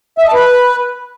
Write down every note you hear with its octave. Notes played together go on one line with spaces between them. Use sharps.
E5
D#5
A5
B4